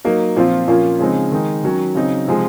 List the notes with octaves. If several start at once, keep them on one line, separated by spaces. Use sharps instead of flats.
F#3 A#3 D#4
A#2 F3 C4 F4
A#2 F3 A#3 C#4 F4
C#3 F3 G#3 C4 D#4
D#3 G#3 D#4
D#3 F#3 C#4
C#3 F#3 C4 D#4
C3 F3 G#3